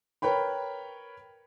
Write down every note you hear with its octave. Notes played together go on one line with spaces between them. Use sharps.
A#4 B4 C#5 G5 B5